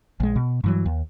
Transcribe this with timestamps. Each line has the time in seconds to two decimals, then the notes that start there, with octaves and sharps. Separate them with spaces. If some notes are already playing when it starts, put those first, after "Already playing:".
0.20 A#1 G#3
0.36 B2
0.64 G2 E3 F#3
0.86 D#2